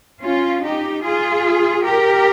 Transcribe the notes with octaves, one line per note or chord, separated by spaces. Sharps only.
C#4 F4
D#4 G4
F4 G#4
G4 A#4